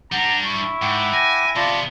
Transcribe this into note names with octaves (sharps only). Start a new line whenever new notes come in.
G3 D4 F#5 A#5
E4 C#6
G#2 F#5 G5 D6
G#5 A#6
C3 B3 F4 D5 A5